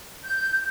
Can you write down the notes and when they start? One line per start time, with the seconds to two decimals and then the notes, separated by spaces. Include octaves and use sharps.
0.24 G6